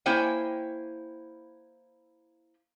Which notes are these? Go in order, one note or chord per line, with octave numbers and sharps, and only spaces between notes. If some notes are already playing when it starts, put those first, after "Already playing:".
A#3 E4 C5 C#5 G5 G#5